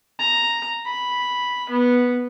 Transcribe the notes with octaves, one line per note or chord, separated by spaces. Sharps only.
A#5
B5
B3